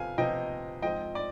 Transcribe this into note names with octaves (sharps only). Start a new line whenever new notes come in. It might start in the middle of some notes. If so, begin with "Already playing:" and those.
Already playing: C3 F3 B3 F5 G#5
C3 F3 B3 D#5 G5
G#2 F3 C4 F4 D#5 G5
D5